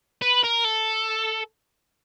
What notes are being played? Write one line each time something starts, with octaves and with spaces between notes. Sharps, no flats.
B4
A#4
A4